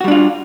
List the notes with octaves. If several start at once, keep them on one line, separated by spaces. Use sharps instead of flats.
G3 D4 F4 F#4